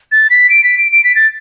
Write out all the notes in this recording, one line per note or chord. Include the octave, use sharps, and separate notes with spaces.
A6
B6
D7
B6
D7
D7
B6
A6